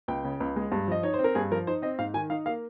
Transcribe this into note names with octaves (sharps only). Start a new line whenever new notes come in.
C#2 G5
C#3
C#2
G#3
G2
F3 D#5
D#4 C#5
C5
C4
A#4
G2 G#4
F3 A#4
D#4 C5
C4 D#5
G#2 F5
D#3 G#5
D#4 F5
A#3 F5